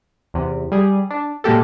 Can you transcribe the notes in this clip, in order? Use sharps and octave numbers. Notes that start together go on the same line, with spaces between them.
E2 C3
G3 G#4
D4
A#2 G#3 A#3 G4 A4